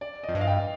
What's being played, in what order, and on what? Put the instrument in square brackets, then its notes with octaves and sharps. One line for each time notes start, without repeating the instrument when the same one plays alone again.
[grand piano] D5
D#5
[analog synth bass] F2
G2
[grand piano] F5
G5